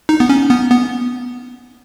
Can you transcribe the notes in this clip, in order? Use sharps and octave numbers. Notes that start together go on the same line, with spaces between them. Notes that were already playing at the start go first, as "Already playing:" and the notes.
D#4
B3
C#4
B3
B3